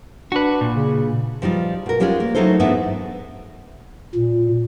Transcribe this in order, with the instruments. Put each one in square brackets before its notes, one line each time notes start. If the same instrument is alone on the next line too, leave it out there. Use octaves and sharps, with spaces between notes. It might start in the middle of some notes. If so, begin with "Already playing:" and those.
[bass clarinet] D4 [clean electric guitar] F#4 B4
[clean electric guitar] A#2
[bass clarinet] C#3
[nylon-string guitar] F3 G3 D#4 F4
B2 A#4
G3 G#3 C#4 F4 G4 G#4
A#3
F#3 A3 D#4 E4 A4 C5
G#2 E3 B3 D4 C5 E5
[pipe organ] A#2